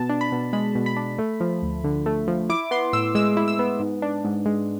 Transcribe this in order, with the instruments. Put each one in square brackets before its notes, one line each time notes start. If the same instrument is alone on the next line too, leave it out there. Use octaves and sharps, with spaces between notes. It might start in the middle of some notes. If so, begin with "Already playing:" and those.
Already playing: [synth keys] B2 A5
D4
B5
B2
G#3 B5
B2
B5
D4
A3
F3
D2
D3
A3
F3
E4 D6
B3 C6
A2 E6
G#3 E6
E4
E6
B3
G#2
D4
G#2
G#3